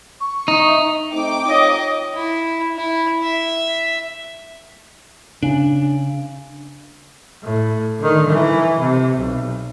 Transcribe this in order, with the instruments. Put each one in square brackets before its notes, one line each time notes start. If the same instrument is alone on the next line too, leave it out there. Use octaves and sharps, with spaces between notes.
[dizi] C#6
[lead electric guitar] D#4
[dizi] E5
[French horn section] A3 C4 D#4 [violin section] G5 D6
[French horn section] D#4 F4 C#5 [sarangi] D#5
[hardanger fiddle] E4
E4
E5
[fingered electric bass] C#3 [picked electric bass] D4
[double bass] A2
D3 D#3
E3
C3
B1